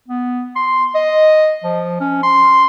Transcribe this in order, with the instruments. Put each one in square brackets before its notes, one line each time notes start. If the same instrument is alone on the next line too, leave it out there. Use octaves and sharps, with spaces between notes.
[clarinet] B3
C6
D#5
F3
C#4
C6